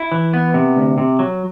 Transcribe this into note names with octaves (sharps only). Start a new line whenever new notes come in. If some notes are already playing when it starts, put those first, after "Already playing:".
Already playing: E4
E3
B3
C3
D2
C3
F#3